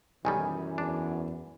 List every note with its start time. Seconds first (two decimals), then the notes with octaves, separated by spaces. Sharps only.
0.25 B1 F#2 D#3 E3 G3 G#5
0.78 E2 D4